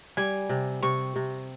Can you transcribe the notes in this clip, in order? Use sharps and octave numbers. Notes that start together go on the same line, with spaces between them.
G3 G#5
C3
C3 C#6
C3